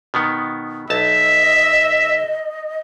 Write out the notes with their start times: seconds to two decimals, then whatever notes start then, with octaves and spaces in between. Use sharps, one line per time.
0.14 B2 D#3 B3
0.90 B1 D#5 E5 A5